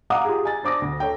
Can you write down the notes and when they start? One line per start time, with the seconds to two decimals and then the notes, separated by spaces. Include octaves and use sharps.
0.10 F5 F#5 A#5 D6 D#6
0.25 F4 G4 G#4
0.45 G#5 A6
0.63 D4 C5 D6 D#6 A#6
0.82 D2
1.00 A4 C#5 G5